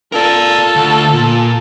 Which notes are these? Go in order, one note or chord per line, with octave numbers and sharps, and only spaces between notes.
F4 A4 A#4 D5
D2
A#2